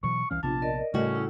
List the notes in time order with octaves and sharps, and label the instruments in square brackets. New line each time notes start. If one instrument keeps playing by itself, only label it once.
[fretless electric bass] B2 E3 F#3 [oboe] C#6
[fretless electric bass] C2 E3 C#4 [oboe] F5
[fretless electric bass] A#1 C3 B3 [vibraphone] D4 F4 [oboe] A5
[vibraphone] A#4 D5 D#5
[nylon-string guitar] A2 F#4 [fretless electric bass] C#3 G3 [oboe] C#4
[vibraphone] E4